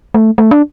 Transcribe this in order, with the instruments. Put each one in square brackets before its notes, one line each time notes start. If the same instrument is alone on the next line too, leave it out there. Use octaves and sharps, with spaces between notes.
[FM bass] A3
A3
D4